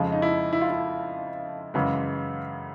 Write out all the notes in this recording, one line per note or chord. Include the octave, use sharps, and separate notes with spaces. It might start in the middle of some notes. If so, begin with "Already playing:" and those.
Already playing: F2 C#3 F3 G#3
D#4
E4
E4
F4
E4
F#2 C#3 E3 G#3